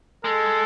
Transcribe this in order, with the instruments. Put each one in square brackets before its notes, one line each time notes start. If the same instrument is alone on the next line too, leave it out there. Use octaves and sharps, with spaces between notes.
[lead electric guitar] G#3 [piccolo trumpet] A4